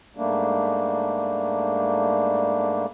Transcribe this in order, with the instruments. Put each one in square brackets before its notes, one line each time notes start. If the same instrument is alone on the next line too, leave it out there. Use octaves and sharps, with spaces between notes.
[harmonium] G#2 G3 A3 A#3 D4